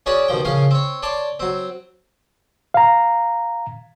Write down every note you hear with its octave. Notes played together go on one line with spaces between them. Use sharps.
C#4 F#4 G#4 B4 C#5 D5
D#2 B2 F3 G5
A#1 C#3 C#4 F5 C6
C4 C#5
C#5 D5 A5 C6 D6
F#3 C4
F5 A#5